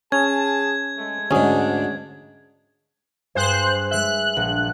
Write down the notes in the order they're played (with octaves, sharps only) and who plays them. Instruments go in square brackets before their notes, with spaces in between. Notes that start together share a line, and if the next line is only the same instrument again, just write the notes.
[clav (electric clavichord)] C#4 [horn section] G#4 A5 [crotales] G#6
[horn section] G#3 A3
[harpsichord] D2 G#2 [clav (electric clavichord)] C#4 G#4 [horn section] D4
[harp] G2 G#4 [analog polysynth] C5 F#6
[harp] G#3 E5 [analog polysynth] F#6
[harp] A#1